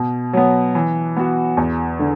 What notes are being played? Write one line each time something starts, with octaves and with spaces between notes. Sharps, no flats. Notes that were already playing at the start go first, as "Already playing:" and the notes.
Already playing: B2
F#3 B3
E3
B3 F#4
E2
D3